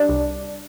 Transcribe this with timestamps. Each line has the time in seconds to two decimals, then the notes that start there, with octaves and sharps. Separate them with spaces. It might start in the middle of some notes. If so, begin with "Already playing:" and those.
Already playing: G3 D4
0.09 C2